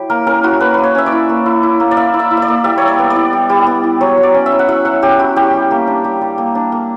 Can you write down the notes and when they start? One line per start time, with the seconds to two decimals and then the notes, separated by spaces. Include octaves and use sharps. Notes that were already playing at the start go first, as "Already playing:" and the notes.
Already playing: F#3 E4 G4
0.10 A#3 A#4
0.27 C#4 A#4
0.44 E4 F#4
0.60 A#3 B4
0.74 A#3 B4
0.83 C#5
0.95 C#4 E5
1.06 D5
1.12 E4
1.29 A#3
1.46 E4
1.63 E4
1.80 A#3
1.91 D5
1.97 A#3 E5
2.14 E4
2.19 E5
2.31 E4
2.37 E5
2.42 D5
2.48 A#3
2.64 G3 E5
2.78 G3 C#5
2.88 D5
2.99 B3
3.10 D5
3.16 E4
3.33 G3
3.50 G3
3.67 B3
3.84 E4
4.01 F#3 C#5
4.17 F#3
4.23 D5
4.34 C#4
4.46 E5
4.52 E4
4.59 F#5
4.69 F#3 E5
4.85 F#3 F#5
5.02 C#4 G4
5.19 E4 F#4
5.36 G3 G4
5.54 G3
5.71 A#3
5.87 D4
6.04 G3
6.21 G3
6.38 A#3
6.55 D4
6.72 A#3